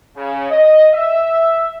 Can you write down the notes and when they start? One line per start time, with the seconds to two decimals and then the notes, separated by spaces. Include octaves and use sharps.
0.16 C#3
0.50 D#5
0.94 E5